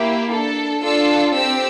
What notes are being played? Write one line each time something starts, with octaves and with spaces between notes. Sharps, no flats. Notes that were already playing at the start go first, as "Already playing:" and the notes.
Already playing: A#3 E4 G4
D4 A4
D4 F4 A4 E6
C4 G4 E6